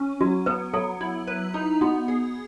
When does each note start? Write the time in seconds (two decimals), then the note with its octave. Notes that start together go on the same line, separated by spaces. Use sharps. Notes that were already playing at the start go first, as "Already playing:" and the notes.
Already playing: C#4
0.21 F#3 F#4
0.46 B3 B4
0.73 F#3 A4
1.01 E4
1.28 B4
1.54 D#4
1.81 B3 F#4
2.08 G#4